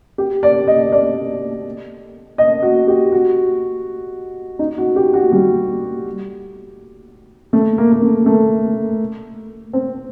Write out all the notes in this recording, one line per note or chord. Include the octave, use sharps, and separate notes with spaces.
G4
D5
D#5
D5
D#5
F#4
G4
F#4
D#4
F#4
G4
F#4
G3
A3
A#3
A#3
A3
A3
C4